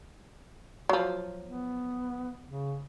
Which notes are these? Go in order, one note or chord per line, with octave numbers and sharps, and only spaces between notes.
F3 F#3
B3
C#3